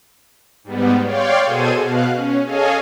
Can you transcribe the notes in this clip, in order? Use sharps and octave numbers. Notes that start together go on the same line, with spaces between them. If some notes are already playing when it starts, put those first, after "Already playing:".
G#2 G3 B3
C#5 D5 F5 G5 C6
B2 G#4 A4 C5 G#6 D#7
B2 F5 F#6
C#4
G#4 A4 C#5 D#5 F5 G#5